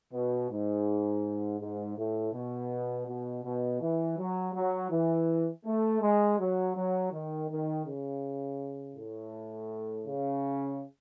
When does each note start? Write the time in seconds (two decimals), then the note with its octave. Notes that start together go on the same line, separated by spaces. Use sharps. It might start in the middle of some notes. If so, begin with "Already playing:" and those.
0.13 B2
0.50 G#2
1.60 G#2
1.97 A2
2.33 B2
3.07 B2
3.43 B2
3.81 E3
4.18 F#3
4.54 F#3
4.91 E3
5.65 A3
6.01 G#3
6.39 F#3
6.76 F#3
7.12 D#3
7.50 D#3
7.85 C#3
8.96 A2
10.06 C#3